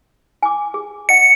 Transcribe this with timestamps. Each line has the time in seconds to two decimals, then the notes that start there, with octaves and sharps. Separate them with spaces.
0.43 G#5 D6
0.74 G#4
1.09 D#5 F#5 C#7